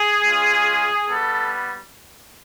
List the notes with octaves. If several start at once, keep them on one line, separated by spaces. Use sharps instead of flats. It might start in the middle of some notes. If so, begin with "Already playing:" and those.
Already playing: G#4
G#3 C#4 F4
G3 B3 A4